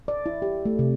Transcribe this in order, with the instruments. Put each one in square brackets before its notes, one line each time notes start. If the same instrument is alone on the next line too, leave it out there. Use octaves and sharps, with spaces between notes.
[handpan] D5
E4
G4
A3
C3